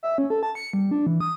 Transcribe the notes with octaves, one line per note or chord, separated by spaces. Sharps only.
E5
C#4
A4
A5
C#7
G3
D4
E3
D#6